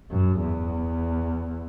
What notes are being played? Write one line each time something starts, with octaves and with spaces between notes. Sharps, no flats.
F#2
E2